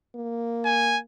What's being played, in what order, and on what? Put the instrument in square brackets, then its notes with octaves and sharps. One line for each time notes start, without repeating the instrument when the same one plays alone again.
[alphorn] A#3
[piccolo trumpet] G#5